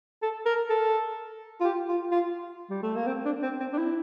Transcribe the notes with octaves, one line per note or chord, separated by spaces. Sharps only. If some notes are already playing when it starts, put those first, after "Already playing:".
A4
A#4
A4
F4
G4
F4
F4
G3
A3
A#3
C4
D4
C4
C4
D4
E4